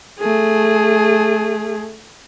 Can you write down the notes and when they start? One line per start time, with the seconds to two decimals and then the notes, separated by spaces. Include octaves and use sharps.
0.20 A3 G#4